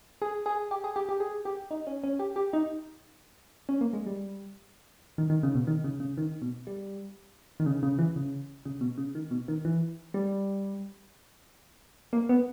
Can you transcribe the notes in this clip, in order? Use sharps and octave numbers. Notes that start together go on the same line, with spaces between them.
G#4
G#4
G4
G#4
G4
G4
G#4
G4
D#4
C#4
C#4
G4
G4
D#4
C#4
A#3
G#3
G3
D#3
D#3
C#3
B2
D#3
C#3
C#3
D#3
B2
G3
D#3
C#3
C#3
E3
C#3
C#3
B2
C#3
D#3
B2
D#3
E3
G3
A#3
B3